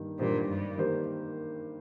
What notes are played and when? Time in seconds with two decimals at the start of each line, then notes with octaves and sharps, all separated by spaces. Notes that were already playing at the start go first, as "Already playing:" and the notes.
Already playing: G2 D#3 A#3 G4
0.19 G2 A#2 D#3 A#3 G4 C5
0.48 G2
0.78 D#3 A#3 G4 C5